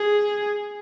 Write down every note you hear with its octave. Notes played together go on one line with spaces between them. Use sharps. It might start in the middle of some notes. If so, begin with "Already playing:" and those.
Already playing: G#4